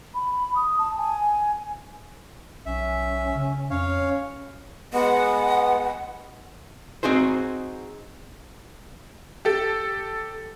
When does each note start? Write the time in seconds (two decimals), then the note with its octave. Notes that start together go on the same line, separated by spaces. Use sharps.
0.15 B5
0.56 D#6
0.79 A5
0.98 G#5
2.66 B1 C#4 E5
3.35 C#3
3.71 F2 C#4 C#5 F5
4.93 G#3 B3 F#5
7.03 C4 D#4 F#4 G#4 C5
9.45 G4 A4